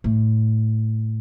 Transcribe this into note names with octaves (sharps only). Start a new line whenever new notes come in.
A2